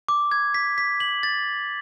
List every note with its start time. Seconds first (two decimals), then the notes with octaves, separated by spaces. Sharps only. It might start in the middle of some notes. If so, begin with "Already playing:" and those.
0.08 D6
0.31 G#6
0.54 B6
0.78 B6
1.00 F#7
1.23 A6